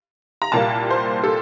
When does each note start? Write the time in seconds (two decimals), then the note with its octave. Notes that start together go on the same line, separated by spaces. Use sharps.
0.42 A#5
0.52 C2 A#2 G3 A#3 A5
0.90 C5
1.24 A4